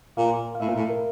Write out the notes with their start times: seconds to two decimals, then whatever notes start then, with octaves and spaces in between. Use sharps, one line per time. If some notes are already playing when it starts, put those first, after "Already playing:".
0.17 A#2 F5
0.55 F5
0.60 A2 E5
0.68 A#2
0.76 A2
0.89 A#4